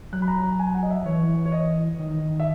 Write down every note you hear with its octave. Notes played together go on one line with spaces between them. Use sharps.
F#3 F#6
B5
A#5
A#5
G#5
F#5
D#5
E5
E3 C#5
C#5
D#5
D#3
E5